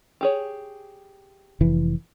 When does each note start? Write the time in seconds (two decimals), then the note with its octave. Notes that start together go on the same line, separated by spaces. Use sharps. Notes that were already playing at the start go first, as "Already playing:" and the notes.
0.21 G4 G#4 C#5
1.61 F1 E3